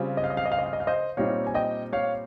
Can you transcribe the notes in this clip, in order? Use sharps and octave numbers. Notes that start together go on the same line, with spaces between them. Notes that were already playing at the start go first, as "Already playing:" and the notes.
Already playing: C#3 G3 C4 F4
D#5
F5
D#5
F5
D#5
F5
D#5
F5
D#5
F5
C5 D#5
A#2 G3 C4 D#4 G4 C#5 F5
G#5
D#5 G5
C#5 F5